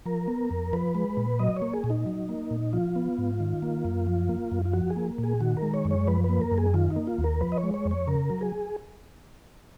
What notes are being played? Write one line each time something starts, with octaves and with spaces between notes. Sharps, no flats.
F3 A#4
B3
F2
F3 B4
G#3
A#2
F#3 D#5
C#5
A#3
G#4
A#2
D#4
F#3
A#3
A#2
F3 F4
B3
G#2
D#3
A#3
F#2
F3
A#3
F#2
F4
F3 F#4
G#4
A#3
A#2
G#4
D#3 F#4
A#4
G#3
C#5
F#2
C#5
F3 B4
A#3 B4
A#4
F#2
G#4
D#3 F4
D#4
A#3
F4
D#2
A#4
F3 B4
D#5
C#5
G#3
C#5
F2
C#5
C#3 A#4
F#3
G#4